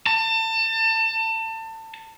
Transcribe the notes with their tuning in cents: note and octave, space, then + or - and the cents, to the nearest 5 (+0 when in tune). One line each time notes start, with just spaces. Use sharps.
A5 +30